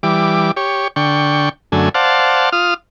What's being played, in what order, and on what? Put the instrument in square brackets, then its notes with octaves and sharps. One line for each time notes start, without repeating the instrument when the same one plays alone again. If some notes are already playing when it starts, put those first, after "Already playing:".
[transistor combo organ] E3 G3 D6
G4 C#5
D3 G5 C#6
F#2 D3 A3 G#5
C5 D5 F5 F#5 A5
F4 D#6 F6